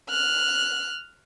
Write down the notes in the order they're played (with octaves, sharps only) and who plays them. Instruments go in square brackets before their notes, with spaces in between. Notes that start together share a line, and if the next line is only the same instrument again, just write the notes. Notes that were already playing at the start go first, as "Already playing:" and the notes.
[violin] F6 F#6